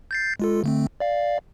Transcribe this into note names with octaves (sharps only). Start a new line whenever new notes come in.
G6 A6 C7
G#3 F4 A4
D3 A3 C4
D5 F5